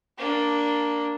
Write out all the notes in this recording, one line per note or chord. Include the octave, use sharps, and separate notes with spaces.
A#3 D4